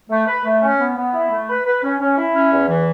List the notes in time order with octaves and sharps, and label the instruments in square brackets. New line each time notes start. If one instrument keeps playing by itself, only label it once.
[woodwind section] A3
B4
A3
C#4
B3
B3
E4
A3
B4
B4
C#4
C#4
E4
C#4
E2
E3